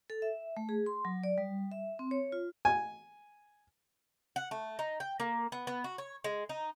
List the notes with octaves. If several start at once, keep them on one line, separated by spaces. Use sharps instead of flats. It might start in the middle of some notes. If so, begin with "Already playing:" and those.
A4
E5
A3
G#4
C6
F#3
D5
G3
E5
C4
C#5
F4
G#5
F#5
A3
D#4
G5
A#3
B3
B3
F#4
C#5
G#3
D#4